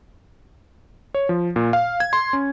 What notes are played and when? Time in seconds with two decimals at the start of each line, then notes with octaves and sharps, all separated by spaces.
1.14 C#5
1.29 F3
1.56 A#2
1.73 F5
2.00 G#6
2.13 C6
2.33 C#4